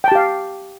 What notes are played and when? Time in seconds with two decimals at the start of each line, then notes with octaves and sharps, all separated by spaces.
0.04 G5
0.08 A5
0.12 G4
0.15 F5